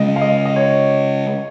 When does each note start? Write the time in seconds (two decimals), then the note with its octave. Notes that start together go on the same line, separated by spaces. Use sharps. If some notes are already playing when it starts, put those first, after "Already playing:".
Already playing: C#3 G#3 C#4 D#5
0.16 F5
0.22 D#5
0.45 D#5
0.56 C#5